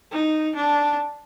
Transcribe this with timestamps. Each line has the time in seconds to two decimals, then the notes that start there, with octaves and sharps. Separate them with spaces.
0.12 D#4
0.55 D4